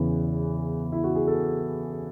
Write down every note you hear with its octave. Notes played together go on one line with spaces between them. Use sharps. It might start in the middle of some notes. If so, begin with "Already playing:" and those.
Already playing: E2 C#3 E3
E4
F#4
G#4
A4